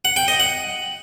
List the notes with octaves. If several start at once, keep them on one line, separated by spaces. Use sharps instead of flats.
F#5
G5
D#5
F#5